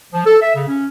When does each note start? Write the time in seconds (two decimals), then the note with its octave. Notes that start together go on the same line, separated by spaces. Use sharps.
0.13 F3
0.26 A4
0.42 E5
0.55 C#3
0.67 C#4